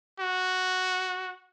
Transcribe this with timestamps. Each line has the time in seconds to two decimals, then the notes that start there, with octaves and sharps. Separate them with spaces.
0.20 F#4